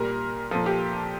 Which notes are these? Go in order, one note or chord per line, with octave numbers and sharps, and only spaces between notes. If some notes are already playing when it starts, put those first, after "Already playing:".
Already playing: A#2 G3 A#4
A#2 F3 A4
G4